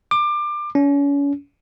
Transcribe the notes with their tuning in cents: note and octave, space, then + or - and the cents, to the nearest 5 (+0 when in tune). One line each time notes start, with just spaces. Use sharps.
D6 +25
C#4 +35